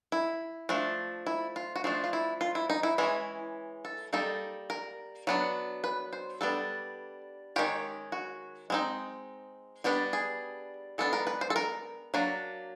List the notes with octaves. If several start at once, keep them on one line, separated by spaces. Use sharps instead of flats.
E4
F3 A3 D4
E4
F4
F#4
F3 A3 D4 F4
F4
E4
F4
E4
D#4
E4
E3 G#3 C#4 E4
A4
G3 A#3 D#4 A4
A#4
F#3 B3 D4
B4
C5
G3 B3 D4 A4
D#3 G#3 C#4 G4
F#4
G#3 C4 D#4
G3 B3 D4 G4
G#4
G#3 B3 D4 A4
A#4
B4
C5
A4
A#4
F#3 A#3 D4